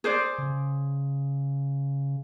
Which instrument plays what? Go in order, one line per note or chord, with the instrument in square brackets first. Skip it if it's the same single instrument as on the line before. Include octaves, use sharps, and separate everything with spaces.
[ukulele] G#4 C5 D5
[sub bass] C#3